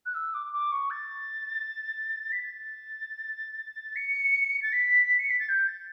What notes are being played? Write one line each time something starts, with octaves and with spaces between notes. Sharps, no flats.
F#6
E6
D6
D6
C#6
A6
B6
A6
C#7
A6
B6
C#7
B6
A6
G6
A6